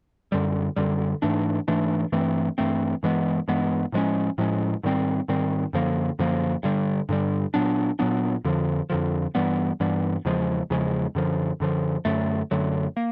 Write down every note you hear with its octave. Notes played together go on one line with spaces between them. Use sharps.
F#2 D3 G3
F#2 D3 G3
G#2 E3 A3 D4
G#2 E3 A3 D4
G2 E3 A3 C4
G2 E3 A3 C4
G2 E3 G#3 B3
G2 E3 G#3 B3
A2 F3 G#3 C#4
A2 F3 G#3 C#4
G#2 D#3 G3 C4
G#2 D#3 G3 C4
F#2 D3 F3 A#3
F#2 D3 F3 A#3
G2 D3 G3
G2 D3 G3
A#2 F#3 B3 D4
A#2 F#3 B3 D4
F2 D3 F3
F2 D3 F3
G2 E3 G3 B3
G2 E3 G3 B3
E2 C#3 F3 G#3
E2 C#3 F3 G#3
F#2 D3 F3
F#2 D3 F3
F#2 D3 F#3 A3
F#2 D3 F#3 A3
A#3